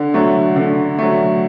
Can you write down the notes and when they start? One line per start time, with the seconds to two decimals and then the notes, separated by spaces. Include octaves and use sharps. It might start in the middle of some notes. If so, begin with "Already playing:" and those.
Already playing: D3
0.14 F#3 A3
0.56 D3
0.99 F#3 A3